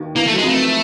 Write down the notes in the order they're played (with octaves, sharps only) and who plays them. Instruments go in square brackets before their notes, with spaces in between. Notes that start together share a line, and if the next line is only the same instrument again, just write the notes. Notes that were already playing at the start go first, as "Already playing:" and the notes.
Already playing: [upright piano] D#2 D#3
[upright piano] E2 E3 [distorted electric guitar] A#3
[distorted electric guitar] A3
[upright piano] F#3
[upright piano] F2 F3 [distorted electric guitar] G#3
[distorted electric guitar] A3